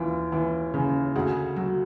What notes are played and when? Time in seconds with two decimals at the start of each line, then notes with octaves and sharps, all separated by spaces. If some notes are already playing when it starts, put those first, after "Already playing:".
Already playing: D#2 E3 F4
0.32 E3
0.74 C#3
1.15 D2 G#4
1.56 F#3